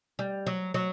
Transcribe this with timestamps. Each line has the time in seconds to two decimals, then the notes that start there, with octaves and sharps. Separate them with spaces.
0.19 G3
0.47 F#3
0.74 F#3